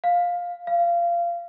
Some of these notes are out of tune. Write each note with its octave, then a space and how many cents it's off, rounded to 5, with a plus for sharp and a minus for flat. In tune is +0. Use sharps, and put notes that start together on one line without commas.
F5 +10
F5 -20